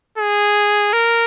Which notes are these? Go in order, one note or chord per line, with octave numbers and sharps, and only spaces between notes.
G#4
A#4